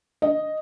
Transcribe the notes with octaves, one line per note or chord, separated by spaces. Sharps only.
D#5